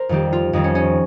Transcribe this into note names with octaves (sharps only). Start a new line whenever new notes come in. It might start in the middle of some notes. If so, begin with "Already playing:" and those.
Already playing: A#4 C5
F2 D#3 G3 G4
F4
F2 D#3 G3 D#4
C#4
C#4